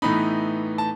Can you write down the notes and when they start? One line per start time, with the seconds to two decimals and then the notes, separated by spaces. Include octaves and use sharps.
0.02 A2 E3 B3 D#4 B5
0.78 A5